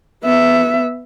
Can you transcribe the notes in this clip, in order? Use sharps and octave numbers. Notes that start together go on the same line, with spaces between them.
B3 E5